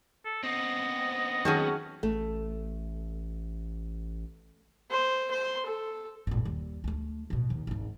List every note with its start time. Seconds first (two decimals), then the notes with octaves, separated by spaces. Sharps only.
0.25 A4
0.44 B3 C4 D#5
1.45 D#3 F#3 C#4 G#4 A4
2.03 A1 A3
4.91 C5
5.31 C5 C6
5.66 A4
6.27 G#1 A#2
6.45 D#2 G3
6.84 D2 A3
7.30 A1 B2
7.50 D#2
7.67 G#1 D2